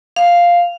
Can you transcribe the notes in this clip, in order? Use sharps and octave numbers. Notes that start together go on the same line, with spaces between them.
F5